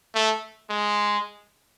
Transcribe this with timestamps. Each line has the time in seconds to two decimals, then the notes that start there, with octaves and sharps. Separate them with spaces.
0.15 A3
0.70 G#3